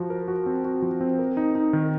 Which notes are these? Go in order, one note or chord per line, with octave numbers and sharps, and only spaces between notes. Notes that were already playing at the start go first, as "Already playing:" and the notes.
Already playing: F3 F#4
A#4
F#4
C4
F#4
F3
C4
A#4
D#4
D#4
D#3